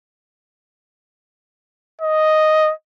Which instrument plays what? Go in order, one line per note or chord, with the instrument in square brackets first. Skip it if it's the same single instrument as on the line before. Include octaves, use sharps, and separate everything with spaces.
[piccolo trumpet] D#5